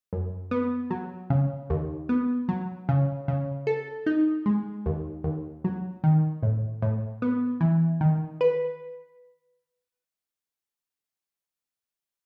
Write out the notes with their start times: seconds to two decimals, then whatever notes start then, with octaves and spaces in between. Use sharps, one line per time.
0.13 F#2
0.51 B3
0.91 F#3
1.30 C#3
1.70 D#2
2.09 B3
2.49 F#3
2.89 C#3
3.28 C#3
3.67 A4
4.06 D#4
4.46 G#3
4.86 D#2
5.24 D#2
5.64 F#3
6.04 D#3
6.43 A2
6.82 A2
7.22 B3
7.61 E3
8.01 D#3
8.41 B4